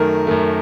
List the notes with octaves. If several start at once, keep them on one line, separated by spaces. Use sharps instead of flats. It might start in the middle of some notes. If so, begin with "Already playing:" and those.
Already playing: F#2 D#3 A3 A#4
F#2 D#3 A3